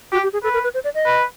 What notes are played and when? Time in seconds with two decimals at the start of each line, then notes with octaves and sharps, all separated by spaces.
0.12 F#4 G4
0.23 G4
0.33 G#4
0.44 A4 B4
0.53 A#4
0.64 B4
0.74 C5
0.84 D5
0.95 D#5
1.05 B4